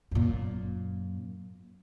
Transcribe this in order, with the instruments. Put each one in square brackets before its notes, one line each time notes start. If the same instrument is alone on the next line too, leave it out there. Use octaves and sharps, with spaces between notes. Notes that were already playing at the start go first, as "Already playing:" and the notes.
[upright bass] F#2 A#2